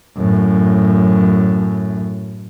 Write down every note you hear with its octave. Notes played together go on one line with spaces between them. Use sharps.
F#2 A2